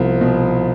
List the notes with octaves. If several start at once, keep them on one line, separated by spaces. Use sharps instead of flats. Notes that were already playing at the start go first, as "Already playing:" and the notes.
Already playing: C2 F3 B3
B2